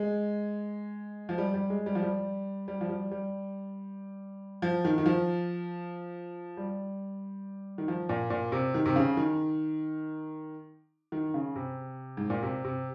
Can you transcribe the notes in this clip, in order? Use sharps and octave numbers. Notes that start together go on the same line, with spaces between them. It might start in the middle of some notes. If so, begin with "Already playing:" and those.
Already playing: G#3
F3
G3
G3
G#3
G3
F3
G3
G3
F3
G3
G3
F3
D#3
D#3
F3
G3
D#3
F3
A#2
A#2
C3
D#3
C3
C#3
D#3
D#3
C#3
C3
G#2
A#2
C3
C3